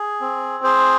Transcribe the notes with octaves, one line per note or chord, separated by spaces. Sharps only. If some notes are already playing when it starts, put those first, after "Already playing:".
Already playing: G#4
C4
G#4 C5